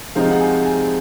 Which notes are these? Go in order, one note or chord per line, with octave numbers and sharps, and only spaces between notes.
C3 F3 G#3 C4 D#4 F5
F#5
G#5
G#5